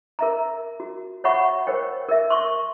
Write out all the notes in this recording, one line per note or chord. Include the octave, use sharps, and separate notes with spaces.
A#4 E5 A#5
F#4
C#5 E5 F#5 B5 C#6
A#4 C5 C#5 G5
A#4 E5
C6 C#6